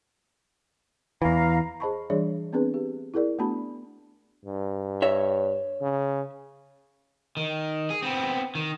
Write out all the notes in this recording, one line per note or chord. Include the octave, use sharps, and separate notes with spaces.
E2 E3 F5 A#5
G#4 C5 D#5 A5 B5 C#6
E3 G3 D4 G#4 C#5 D5
B3 C4 D4 G#4 B4
G4
E4 G#4 A#4 D5
A3 B3 D4 F#4 A5 B5
G2
C#5 E5
C#3
D#3
G#4
B3 C4
D#3